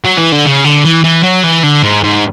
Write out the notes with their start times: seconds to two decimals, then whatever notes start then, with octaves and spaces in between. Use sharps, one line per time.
0.05 F#3
0.18 E3
0.32 D3
0.45 C#3
0.64 D3
0.85 E3
1.04 E3
1.23 F#3
1.44 E3
1.63 D3
1.83 G#2
2.03 G#2